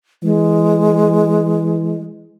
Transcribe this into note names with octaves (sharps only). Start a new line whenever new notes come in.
E3 G#3